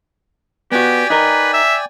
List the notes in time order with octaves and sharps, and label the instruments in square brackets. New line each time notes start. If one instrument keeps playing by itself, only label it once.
[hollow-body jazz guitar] B3 F#4 [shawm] G4 [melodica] D5 G5 G#5
[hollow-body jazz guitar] D#4 A#4 [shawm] B4
[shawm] E5